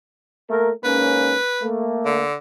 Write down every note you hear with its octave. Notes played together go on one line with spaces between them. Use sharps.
A3 A#3 A#4
G#2 A#3 C#4 B4
A3 A#3
D3